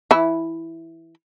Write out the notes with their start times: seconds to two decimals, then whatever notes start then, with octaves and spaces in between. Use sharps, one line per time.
0.11 E3 E4